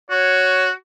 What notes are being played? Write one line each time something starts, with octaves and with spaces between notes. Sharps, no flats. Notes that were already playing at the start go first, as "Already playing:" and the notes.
F#4 C#5